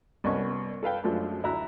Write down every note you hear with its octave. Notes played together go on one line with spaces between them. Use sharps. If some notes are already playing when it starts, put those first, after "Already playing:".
C2 B3 C#4 D#5 A5 C#6
A4 B4 F5 G5
F#2 F3 G#3 A3 D4
D2 E4 E5 A#5 F#6